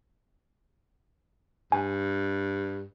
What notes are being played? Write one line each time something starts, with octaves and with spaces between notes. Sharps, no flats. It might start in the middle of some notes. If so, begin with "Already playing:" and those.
G2 G#5